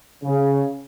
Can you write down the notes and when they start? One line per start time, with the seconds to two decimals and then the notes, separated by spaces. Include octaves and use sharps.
0.23 C#3